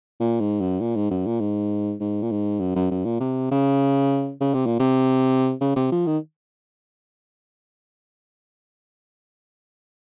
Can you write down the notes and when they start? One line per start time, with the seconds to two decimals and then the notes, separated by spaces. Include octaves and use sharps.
0.20 A#2
0.40 G#2
0.61 F#2
0.80 A#2
0.96 G#2
1.11 F#2
1.26 A#2
1.40 G#2
2.00 G#2
2.23 A#2
2.31 G#2
2.60 F#2
2.75 F#2
2.91 F#2
3.05 A#2
3.20 C3
3.52 C#3
4.41 C#3
4.54 C3
4.66 A#2
4.80 C3
5.61 C#3
5.76 C3
5.92 F3
6.07 D#3